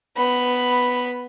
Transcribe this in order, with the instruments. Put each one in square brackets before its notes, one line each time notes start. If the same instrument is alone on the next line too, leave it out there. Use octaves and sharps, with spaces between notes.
[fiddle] B3 B5